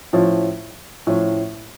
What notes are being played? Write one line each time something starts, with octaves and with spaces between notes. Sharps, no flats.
A2 F3 C#4
A2 F3 C#4